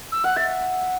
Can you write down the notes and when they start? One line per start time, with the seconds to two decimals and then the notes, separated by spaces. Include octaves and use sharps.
0.12 E6
0.24 F#5 F#6
0.36 E5 A6